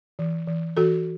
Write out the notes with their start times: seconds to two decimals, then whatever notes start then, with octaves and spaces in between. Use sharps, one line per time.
0.19 E3
0.47 E3
0.77 E3 F#4 A4